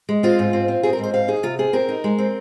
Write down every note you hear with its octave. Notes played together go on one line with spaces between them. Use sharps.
G#3
C4 F4
G#2
C4
C4
C4 G#4
A#4
G#2 C5
C4 F5
D#4 G#4
C3 F4
C4 G#4
C4 A#4
D#4
G#3
C4